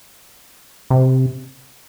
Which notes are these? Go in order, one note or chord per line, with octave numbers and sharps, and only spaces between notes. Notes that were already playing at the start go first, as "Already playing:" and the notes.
C3